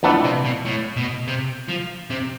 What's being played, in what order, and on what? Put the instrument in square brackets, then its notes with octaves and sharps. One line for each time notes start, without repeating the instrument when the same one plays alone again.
[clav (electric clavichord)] F2 E3 B3 D4 [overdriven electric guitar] A3
[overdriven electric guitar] C3
B2
A2
B2
C3
F3
C3